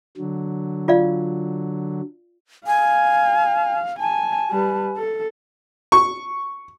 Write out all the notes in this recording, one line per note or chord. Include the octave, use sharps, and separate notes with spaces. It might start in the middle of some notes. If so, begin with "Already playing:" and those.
D3 F#3
F4 D5 F5
F5 G#5
G#5 A5
G3 B4
A4
C#6